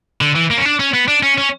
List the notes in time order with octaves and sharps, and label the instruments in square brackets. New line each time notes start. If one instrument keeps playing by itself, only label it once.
[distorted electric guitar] D3
E3
A#3
C#4
D4
C#4
B3
D4
C#4
C#4